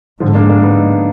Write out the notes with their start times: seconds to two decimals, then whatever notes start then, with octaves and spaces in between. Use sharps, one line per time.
0.20 G#2 D3 F3
0.35 A#3 D4
0.49 A#3 D4
0.63 B3 D#4